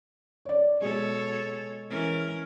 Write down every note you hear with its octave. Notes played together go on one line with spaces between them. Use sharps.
C#5 D5
B2 G#3 A4 C#5
E3 C#4 A#4